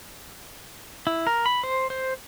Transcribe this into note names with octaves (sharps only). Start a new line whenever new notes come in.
E4
A#4
B5
C5
C5